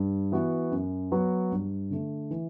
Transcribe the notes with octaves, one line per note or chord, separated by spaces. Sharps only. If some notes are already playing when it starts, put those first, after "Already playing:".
Already playing: G2
E3 B3 F#4
F#2
F#3 B3 F#4 B4
G2
D3 A3
E3